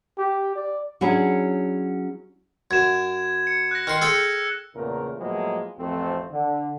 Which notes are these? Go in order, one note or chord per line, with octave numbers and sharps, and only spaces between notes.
G4
D5
F#3 C#4 D4 E4 G#4
F#2 G#6 E7
C#7
F#6 A#6
D#3 C6 F6 C#7
G#4 A4 G5 E6 C#7
E2 A#2 C#3 A3 A#4
A2 F3 F#3 G#3 A#3 B3
A1 F2 F3 A3 C4 A4
D3